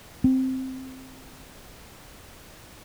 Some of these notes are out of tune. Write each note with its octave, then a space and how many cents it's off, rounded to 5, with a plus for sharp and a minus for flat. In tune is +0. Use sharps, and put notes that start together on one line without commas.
C4 +0